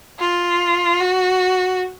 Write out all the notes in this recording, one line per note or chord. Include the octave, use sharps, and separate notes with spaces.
F4
F#4